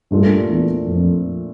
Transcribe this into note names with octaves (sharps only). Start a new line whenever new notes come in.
G2 A#2 A3 D4 F4
E2
F2